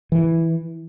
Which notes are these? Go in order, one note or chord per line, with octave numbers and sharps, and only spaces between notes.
E3